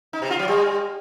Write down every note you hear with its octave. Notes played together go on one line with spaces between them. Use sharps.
D#4
C3
F4
F#3
G3